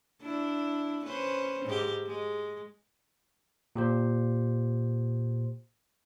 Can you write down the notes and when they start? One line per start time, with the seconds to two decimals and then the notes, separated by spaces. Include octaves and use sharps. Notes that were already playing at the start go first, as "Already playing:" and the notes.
0.22 D4 E4
1.04 C#4 B4 C5
1.65 G#2 G4
2.06 G#3
3.76 A#2 G4 C5